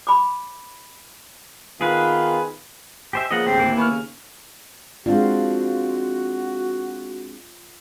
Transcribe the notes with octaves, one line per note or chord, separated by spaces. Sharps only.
B5 D6
D#3 B3 F4 G#4 B4
G4 C5 D#5 E5 G#5
C#3 F3 A#3 B3 D#5 F#5
A1 D2 C4 G4
D#2 A#3 E4
B3 G#5 C#6 F6
C#3
G#3 C4 D4 F4 F#4